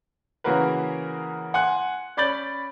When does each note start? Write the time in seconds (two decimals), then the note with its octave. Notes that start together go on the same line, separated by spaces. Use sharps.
0.44 C#3 E3 A#3 F#4 A#4 B4
1.54 F#5 G#5 C6 F#6
2.17 C#4 D5 B5 G6 A6 F#7